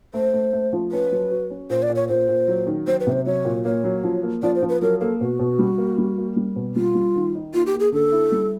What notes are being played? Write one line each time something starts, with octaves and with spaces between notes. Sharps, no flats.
A3 C5
A3
A3
F3
C#4 B4
F#3
F#4
C#4
A#2 C5
D5
A#2
C#5
A#2 C5
A#2
F#3
D#3
F#3 C5
B4
C3
C5
F#3 C#5
A#2
A#3 C#5
F#3
F3
A#3
F3 D5
C5
F3
B4
F#3 A#4
A#3 A4
B2 F#4
B2
G3
A#3
G3
A#3
G3
B2
G3 F4
G3
D#3
D#4
A#3 F4
G4
A#3
G#4
D3 A4
E4
G3